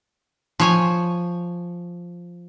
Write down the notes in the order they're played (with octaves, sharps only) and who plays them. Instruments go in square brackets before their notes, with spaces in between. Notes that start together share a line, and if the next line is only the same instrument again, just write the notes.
[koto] F3 C#5 G#5